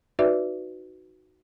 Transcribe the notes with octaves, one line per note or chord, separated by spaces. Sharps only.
D#4 F#4 B4 D5 E5